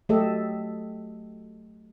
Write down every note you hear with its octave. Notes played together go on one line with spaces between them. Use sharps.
F#3 A3 G4 A4 D#5 E5